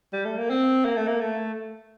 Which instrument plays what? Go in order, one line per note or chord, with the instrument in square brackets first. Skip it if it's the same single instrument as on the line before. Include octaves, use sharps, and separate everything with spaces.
[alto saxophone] G3
A3
A#3
C4
A#3
A3
A#3
A3